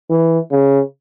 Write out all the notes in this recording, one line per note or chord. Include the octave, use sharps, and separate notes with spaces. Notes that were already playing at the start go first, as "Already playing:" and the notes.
E3
C#3